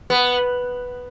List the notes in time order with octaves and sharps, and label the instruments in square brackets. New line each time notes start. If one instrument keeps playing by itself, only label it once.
[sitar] B3